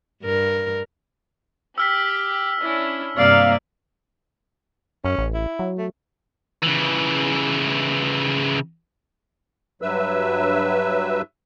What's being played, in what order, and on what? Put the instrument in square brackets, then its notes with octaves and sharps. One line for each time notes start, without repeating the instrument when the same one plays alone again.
[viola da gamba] G2 A#4
[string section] G4 [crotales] E6 F6 B6
[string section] C#4 D4 E4
[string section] G2 C3 A#3 [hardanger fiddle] D5 [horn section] F5
[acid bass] F#2 [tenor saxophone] C#4
[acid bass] A1
[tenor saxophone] E4
[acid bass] F#3
[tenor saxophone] A3
[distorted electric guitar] C#3 E3
[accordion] G2 F#3 B4 E5 E6